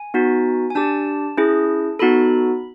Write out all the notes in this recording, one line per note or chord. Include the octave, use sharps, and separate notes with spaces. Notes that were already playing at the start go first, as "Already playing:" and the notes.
Already playing: G#5
B3 D#4 F#4
G#5
D4 G4 A5
C#4 E4 G#4
B3 D#4 F#4 A4 B5